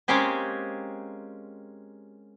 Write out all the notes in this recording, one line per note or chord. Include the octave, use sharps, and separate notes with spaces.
G#3 A#3 C4 C#4 G4 G#4